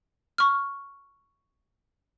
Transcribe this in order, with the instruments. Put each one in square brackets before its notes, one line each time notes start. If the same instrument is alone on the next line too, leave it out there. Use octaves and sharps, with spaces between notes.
[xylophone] C#6 F6